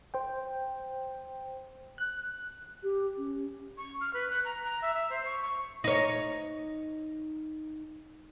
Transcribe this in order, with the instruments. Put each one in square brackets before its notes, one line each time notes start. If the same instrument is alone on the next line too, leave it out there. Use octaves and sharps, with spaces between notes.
[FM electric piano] C5 G5
[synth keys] F#6
[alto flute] G4
C#4
[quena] C#6
F6
B4
F#6
A#5
A#5
E5
E5
C5
C#6
C#6
[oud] D#4 C#5